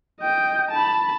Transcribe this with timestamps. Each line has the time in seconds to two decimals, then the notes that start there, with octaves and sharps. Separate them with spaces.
0.21 D#5 G5
0.71 A5 B5